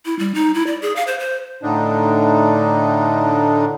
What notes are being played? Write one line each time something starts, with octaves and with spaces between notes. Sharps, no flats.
E4
G3
D#4
E4
D5
G#4
F5
C5
C5
A2 D3 D4 D#4